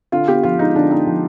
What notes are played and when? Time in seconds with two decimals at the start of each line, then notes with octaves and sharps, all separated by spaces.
0.12 D3 F4
0.28 B3 G4
0.43 F3 F4
0.59 G#3 D#4
0.75 D3 D4
0.91 B3 D#4
1.07 F3